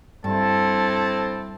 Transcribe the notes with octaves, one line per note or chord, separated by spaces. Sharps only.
G2 C4 E4 A4 A5